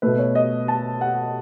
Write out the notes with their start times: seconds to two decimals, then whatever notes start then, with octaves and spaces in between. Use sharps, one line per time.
0.02 B2 A3 B4
0.19 C#5
0.35 D#5
0.68 A5
1.01 F#5